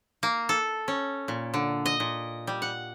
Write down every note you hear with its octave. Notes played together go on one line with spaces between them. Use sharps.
A#3
A4
C#4
A#2
D3
D#5
A#2
G3
F#5